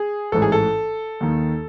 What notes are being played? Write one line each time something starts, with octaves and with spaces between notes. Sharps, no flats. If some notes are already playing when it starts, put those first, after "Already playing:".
Already playing: G#4
A1 G#2 E3 A4
G#4
A4
D#2 D#3